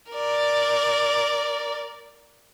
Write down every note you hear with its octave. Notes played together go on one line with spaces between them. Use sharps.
A#4 D5